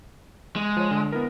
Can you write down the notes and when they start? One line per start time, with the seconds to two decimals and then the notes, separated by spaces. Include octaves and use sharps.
0.56 G#3
0.77 F3 C#5
0.91 D3
1.12 B3 E4 A#4